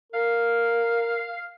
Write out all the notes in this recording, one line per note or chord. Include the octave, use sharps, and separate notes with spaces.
A#4 F5